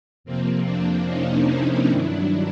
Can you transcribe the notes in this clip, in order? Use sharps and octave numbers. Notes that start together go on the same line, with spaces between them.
F2 C3 F3 A#3 C4
C4 D4
C#4 D#4
D4 E4
G2 D#3 F#3 D4 E4